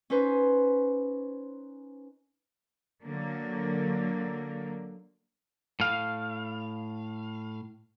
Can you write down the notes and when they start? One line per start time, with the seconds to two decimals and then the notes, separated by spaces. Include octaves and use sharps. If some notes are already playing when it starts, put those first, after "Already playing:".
0.10 C#4 D#4 B4 C5
3.00 D3 F#3 A#3
5.80 A2 F5